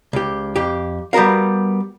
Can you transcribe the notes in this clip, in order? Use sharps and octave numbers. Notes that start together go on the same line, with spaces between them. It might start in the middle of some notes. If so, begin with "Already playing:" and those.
C#2 G4
F2 G4
G3 B3 F#4 A#4 F5